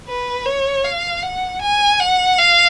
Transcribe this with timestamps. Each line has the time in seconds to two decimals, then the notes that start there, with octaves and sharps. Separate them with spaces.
0.08 B4
0.46 C#5
0.85 F5
1.23 F#5
1.62 G#5
2.00 F#5
2.39 F5